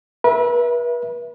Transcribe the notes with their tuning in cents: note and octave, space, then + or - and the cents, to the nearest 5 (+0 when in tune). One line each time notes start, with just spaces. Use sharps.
B4 -40 E5 +0